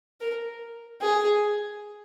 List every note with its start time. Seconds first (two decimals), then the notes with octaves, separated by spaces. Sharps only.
0.21 A#4
1.02 G#4